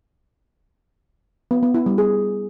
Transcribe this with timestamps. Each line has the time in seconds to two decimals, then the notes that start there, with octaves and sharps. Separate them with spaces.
1.51 B3
1.63 B3
1.74 E4
1.86 G3
1.98 G#4